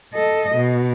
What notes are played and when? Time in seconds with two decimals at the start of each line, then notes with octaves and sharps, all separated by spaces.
0.14 A4 D#5
0.56 B2